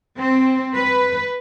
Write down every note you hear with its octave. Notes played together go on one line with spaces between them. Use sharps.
C4
B4